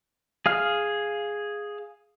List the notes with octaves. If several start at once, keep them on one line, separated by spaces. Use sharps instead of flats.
G#4 F5 F6